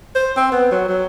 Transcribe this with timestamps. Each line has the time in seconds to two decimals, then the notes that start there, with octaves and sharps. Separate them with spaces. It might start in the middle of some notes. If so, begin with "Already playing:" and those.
0.16 C5
0.37 C4
0.52 B3
0.72 F#3
0.89 F#3